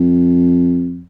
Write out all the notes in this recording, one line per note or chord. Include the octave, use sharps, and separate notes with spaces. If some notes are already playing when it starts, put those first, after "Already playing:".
Already playing: F2